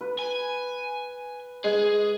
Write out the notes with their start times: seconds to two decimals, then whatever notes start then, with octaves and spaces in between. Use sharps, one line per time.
0.01 B4
0.19 G#5
1.64 G#3 G#4